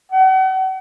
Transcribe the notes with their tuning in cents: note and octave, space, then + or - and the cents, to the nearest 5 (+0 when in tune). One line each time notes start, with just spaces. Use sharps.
F#5 +40